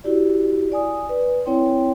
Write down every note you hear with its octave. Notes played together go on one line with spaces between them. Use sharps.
E4 F#4 G4 D5
D5 G#5 D#6
B4
C4 E4 C#5 G5 C6